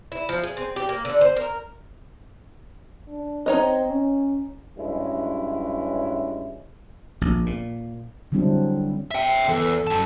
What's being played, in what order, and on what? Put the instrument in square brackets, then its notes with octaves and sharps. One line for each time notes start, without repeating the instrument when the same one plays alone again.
[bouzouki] E4
F3
G#4
C4
G4
A#3
D3
C5
A#4
[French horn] D4
[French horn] C4 [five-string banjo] D#4 C#5 D#5
[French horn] C#4
[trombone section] G2 F#3 G#3 C#4 E4
[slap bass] A#1
A#2
[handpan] D3 F#3 G3 C4 D4 E4
[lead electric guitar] E5 G5
[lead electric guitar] E2 [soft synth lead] A4
[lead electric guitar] F#2 A5